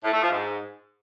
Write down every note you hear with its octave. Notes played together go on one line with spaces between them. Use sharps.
A2
A3
F3
G#2